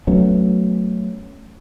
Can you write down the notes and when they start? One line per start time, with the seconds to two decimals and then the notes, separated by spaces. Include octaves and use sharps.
0.07 F#3 A3 B3 C#4